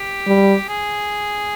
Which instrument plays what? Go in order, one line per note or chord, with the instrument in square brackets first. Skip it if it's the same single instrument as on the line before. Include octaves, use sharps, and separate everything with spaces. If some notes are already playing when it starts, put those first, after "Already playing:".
Already playing: [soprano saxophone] G4
[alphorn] G3
[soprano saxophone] G#4